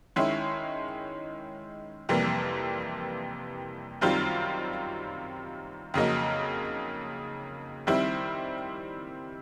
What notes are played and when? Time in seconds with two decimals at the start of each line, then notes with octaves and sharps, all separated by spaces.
0.16 D#3 G#3 C#4 E4
2.09 F2 C3 E3 G3 A#3
4.01 F#2 D#3 G3 C4 F4
5.94 F2 C#3 F#3 A#3 D#4
7.87 D#3 G3 C4 E4